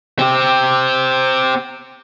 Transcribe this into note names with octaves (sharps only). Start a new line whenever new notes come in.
C4 G4